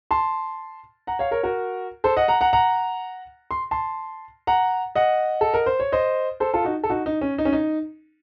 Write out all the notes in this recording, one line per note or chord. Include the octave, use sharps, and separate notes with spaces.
A5 C6
F#5 A#5
C#5 F5
A#4 C#5
F#4 A#4
A4 C5
D#5 F#5
F#5 A#5
F#5 A#5
F#5 A#5
C6
A5 C6
F#5 A#5
D#5 F#5
A4
A#4
C5
C#5
C5 D#5
A4 C5
F4 A4
D#4 F#4
A4
D#4 F#4
D#4
C#4
D#4
C#4
D#4